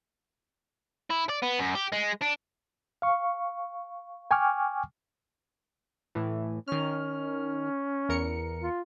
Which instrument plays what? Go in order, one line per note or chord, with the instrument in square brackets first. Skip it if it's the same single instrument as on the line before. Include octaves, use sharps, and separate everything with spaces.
[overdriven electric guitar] E4
D5
B3
F#2
G4
G#3
D4
[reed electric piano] F5 C#6
G5 G#5 C#6 D6 F6
[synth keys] A2 E3
[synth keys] D#3 F6 [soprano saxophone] C#4
[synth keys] E2 A#4 C#7
[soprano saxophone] F4